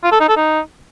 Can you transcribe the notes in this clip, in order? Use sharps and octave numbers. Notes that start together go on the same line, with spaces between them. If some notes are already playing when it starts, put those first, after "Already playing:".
F4
A4
D#4
A4
D#4